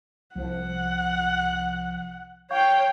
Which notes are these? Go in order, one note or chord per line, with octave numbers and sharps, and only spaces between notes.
C2 F3 F#5
C#5 F5 G5 C#6 G6